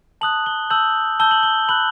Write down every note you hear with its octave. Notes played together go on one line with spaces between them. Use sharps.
A5 D#6 F#6 F#7
G7
A5 E6 G6 F#7
A5 E6 G6 G7
F#7
G7
B5 F#6 F#7